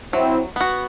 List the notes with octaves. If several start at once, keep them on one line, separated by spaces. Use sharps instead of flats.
F#3 C4 E4
B3 F#4